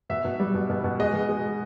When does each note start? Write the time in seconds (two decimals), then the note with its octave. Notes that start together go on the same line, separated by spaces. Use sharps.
0.10 B2 E5
0.25 B2
0.40 G3
0.54 B2
0.70 B2
0.84 B2
0.99 G#3 D#5
1.14 B2
1.29 G#3
1.44 G#3